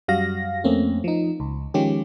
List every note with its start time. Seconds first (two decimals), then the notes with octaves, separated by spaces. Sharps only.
0.08 F#2 G3 F#4 F5 A#6
0.64 F2 A3 A#3 C4 C#4
1.04 F3 D#4
1.40 C#2
1.74 D#3 F3 G#3 C#4 F4 G4